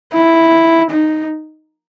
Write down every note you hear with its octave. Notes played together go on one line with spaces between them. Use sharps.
E4
D#4